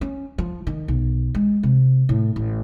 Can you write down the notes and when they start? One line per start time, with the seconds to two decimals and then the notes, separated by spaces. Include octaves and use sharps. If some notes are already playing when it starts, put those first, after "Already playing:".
0.01 C#4
0.38 F3
0.67 D#3
0.88 B1
1.35 G#3
1.63 C3
2.09 A2
2.36 A1